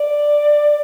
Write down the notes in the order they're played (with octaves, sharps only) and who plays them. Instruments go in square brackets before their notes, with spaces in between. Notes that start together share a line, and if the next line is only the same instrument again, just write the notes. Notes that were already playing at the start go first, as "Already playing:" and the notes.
Already playing: [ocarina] D5